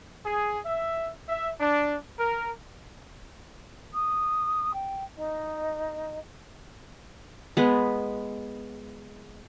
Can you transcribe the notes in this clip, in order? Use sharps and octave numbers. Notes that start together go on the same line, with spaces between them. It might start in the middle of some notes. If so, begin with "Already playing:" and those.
G#4
E5
E5
D4
A#4
D#6
G5
D#4 D#5
G#3 B3